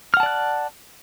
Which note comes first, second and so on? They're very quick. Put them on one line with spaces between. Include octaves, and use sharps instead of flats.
F6 F#5 A5 D5 F#6